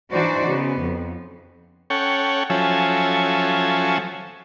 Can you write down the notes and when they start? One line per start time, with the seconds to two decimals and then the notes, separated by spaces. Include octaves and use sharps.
0.12 E3 D4 D#4 F#4 C5 D5
0.48 C#3 B3
0.80 F2
1.90 C#4 A4 C#5 F#5 G5
2.50 F3 F#3 C#4 A4 E5 G#5